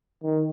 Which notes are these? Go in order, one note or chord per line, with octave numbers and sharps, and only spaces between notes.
D#3